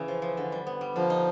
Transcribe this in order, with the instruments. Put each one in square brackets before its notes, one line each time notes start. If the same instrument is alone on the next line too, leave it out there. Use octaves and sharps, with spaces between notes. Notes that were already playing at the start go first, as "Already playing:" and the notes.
Already playing: [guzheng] C#3 [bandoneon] E3
[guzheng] F3
F3
D3
G3
B3
G3
[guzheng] D3 [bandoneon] F3
[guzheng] D#4